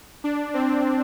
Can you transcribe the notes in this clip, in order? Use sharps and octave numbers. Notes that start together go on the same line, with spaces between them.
D4
C4